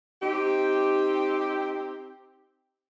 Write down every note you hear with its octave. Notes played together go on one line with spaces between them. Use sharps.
C4 D#4 G4